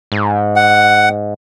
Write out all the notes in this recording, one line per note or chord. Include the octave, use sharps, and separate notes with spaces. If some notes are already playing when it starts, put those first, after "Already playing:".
G#2
F#5